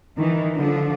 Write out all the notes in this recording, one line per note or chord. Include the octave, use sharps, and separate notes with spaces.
D#3 E3
D3 F3 D4